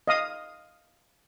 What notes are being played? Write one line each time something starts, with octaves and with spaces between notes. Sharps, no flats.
D#5 F5 D#6